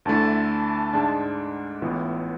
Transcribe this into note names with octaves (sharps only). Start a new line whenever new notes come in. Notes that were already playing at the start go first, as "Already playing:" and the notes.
D2 D3 A3 E4 A5
G#2 G#3 D4
A1 A2 E3 B3 F4